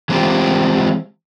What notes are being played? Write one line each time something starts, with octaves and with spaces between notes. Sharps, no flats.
E3 G#3 C4 C#4 F4 G4